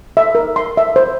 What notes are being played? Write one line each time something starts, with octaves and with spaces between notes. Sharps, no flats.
E5
A#4
C6
E5
C5